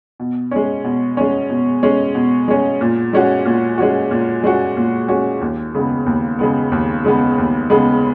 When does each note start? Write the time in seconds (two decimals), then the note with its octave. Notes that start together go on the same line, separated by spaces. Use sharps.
0.20 B2
0.51 G#3 C#4
0.84 B2
1.17 G#3 C#4
1.50 B2
1.83 G#3 C#4
2.15 B2
2.48 G#3 C#4
2.81 A#2
3.13 G#3 C#4 F#4
3.45 A#2
3.78 G#3 C#4 F#4
4.11 A#2
4.44 G#3 C#4 F#4
4.77 A#2
5.08 G#3 C#4 F#4
5.41 D#2
5.75 C#3 G#3 B3
6.06 D#2
6.39 C#3 G#3 B3
6.72 D#2
7.04 C#3 G#3 B3
7.38 D#2
7.70 C#3 G#3 B3